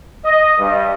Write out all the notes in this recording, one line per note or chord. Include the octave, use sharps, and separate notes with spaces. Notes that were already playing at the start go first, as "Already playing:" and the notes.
D#5
G2